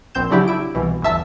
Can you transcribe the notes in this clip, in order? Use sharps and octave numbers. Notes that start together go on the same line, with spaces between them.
A#1 C4 G6 E7
C#3 F#3 D4 E4 G4
E4 D7
C2 B2 E3
G1 E2 E5 A5 E6